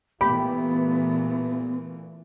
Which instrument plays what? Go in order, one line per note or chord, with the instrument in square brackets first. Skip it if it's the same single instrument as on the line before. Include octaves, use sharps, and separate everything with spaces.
[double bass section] A#2 E3 A3 [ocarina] B3 [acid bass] G4 [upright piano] B5